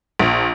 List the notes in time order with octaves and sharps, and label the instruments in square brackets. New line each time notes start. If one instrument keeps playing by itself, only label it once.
[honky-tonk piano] A#1